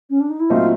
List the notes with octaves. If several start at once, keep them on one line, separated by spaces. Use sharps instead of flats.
C#4
D4
D#4
E4
A#2 F#3 A3 C4 D#4 F4